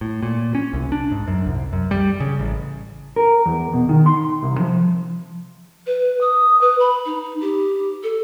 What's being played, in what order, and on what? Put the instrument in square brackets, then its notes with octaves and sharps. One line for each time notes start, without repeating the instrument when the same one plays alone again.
[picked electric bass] A2
A#2
C#4
C2
D4
G#2
F#2
C2
F#2
G3
C#3
A1
[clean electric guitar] A#4
E2
B2
D#3
C6
C2
F3
[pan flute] B4
D#6
B4
B5
D#4
G4
A4